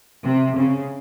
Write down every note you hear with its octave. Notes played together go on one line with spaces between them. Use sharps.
C3
C#3